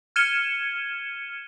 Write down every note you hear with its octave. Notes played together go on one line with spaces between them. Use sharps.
F6 G#6 C#7 D#7 E7 G7